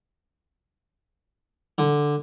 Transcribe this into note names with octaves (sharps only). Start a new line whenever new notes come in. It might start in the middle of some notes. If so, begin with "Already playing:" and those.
D3